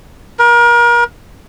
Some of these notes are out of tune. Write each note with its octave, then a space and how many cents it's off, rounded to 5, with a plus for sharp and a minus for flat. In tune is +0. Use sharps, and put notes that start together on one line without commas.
A#4 +35